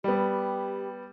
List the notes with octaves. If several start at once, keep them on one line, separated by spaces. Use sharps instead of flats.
G3 B3 G4